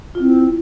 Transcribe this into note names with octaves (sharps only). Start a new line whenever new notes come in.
F4
C4 E4